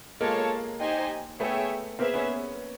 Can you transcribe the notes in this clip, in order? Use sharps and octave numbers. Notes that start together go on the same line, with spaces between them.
G#3 A#3 F4 A4 C#5 F5 A5
D#4 G4 C5 D#5 G#5
A3 B3 G#4 C#5 E5 G5
A#3 C4 G#4 B4 E5
B3 C#4